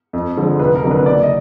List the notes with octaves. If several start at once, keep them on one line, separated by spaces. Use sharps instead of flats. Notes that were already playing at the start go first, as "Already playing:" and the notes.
F2
D3 F3 G#3
F1 B4
A#4
F2 D3 F#3
B4
F#1 D5
D#5